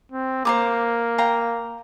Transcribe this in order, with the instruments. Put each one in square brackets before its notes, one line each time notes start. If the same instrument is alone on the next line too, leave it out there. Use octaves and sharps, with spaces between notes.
[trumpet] C4
[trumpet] A#3 [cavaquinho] C5 A#5 D6
[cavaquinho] F5 G5 A#5